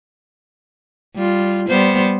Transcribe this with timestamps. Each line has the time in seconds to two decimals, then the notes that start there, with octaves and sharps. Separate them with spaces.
1.15 G3 F4
1.68 G3 B3 C5